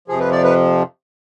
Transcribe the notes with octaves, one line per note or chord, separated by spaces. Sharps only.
F2 C3 F3 G#4
B4
D5
B4